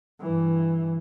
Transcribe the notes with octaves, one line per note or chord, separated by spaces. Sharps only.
G2 E3